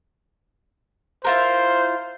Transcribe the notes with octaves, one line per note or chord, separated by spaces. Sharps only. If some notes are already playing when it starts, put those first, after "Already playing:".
E4 F4 A#4 C5